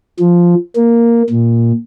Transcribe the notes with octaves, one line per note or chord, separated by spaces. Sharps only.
F3
A#3
A#2